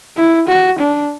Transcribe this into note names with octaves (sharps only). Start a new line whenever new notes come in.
E4
F#4
D4